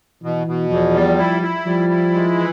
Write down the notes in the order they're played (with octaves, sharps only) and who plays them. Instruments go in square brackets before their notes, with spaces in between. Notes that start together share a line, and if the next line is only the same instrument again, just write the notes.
[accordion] B2 [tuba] E3
[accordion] B2
[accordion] E2 [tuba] F3
[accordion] G3
E4
E4
[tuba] F3 [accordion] G3
[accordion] E4
G#3
E3